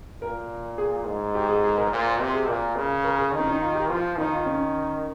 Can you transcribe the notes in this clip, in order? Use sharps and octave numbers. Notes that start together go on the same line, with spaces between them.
A#2 A#4
G#4
G#2
G4
G#4
G#4
A#4
A#2 C5
C5
C3 C5
G#4
A#2 A#4
C#3
A#4
G#4
D#3
C#4
D#4
F4
G4
F3 F4
D#3 D#4
F4
C#4